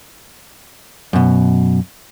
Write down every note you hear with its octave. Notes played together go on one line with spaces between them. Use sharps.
F#2 B2